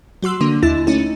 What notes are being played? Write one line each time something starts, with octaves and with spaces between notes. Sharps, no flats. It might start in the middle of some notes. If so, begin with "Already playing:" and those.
F#3 F#4 C6 E6
D3 A#3 D4
D#2 E4 A6
A3 C#4 D#4